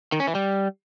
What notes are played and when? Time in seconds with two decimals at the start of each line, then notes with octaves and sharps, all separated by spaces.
0.12 D#3
0.20 C#4
0.27 E3
0.35 G3